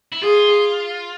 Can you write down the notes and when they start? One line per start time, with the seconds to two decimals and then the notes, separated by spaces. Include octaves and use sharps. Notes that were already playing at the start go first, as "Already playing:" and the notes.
0.12 E4
0.23 F4 G#4